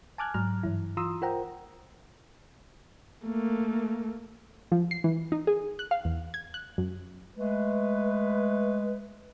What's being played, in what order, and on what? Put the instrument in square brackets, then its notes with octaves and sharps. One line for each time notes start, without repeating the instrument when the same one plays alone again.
[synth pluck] G#5 A5 D6 F6 F#6 G#6
G#2 F#3 A#5 F6
G2 E3 E4
E3 F4 A#5 C6 D#6 E6
F4 A#4 C5 F#5 G5 A#5
[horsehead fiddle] A3 A#3
[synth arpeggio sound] F3
C7
E3
D#4
G#4
F#6
F5
E2
G#6
F#6
F#2
[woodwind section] G#3 A3 B4